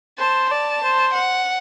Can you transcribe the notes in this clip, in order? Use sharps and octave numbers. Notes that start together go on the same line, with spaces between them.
C5 A5
D5 A5
C5
F#5